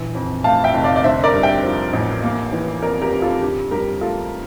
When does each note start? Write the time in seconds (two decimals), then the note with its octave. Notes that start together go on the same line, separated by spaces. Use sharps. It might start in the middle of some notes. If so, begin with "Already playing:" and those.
Already playing: A#1 E3
0.15 F2
0.44 A3 F5 A5
0.64 E5 G5
0.74 F1
0.84 D5 F5
0.96 D5
1.04 D3 C5 E5
1.24 A#4 D5
1.33 G2
1.43 E5 G5
1.63 F3
1.93 A1
2.23 A#3
2.52 E3
2.82 F2 A#4 D5
3.02 G4 A#4
3.12 F2
3.22 F4 A4
3.42 D3 G4
3.71 G2 G4 A#4
4.01 A3 F4 A4